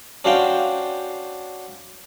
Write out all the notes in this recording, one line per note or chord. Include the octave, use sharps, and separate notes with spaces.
C#4 D4 F#4 C5 F5 G5